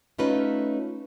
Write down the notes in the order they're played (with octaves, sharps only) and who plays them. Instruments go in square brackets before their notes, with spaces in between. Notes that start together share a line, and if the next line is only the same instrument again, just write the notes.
[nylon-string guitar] A3 C#4 D#4 F4 B4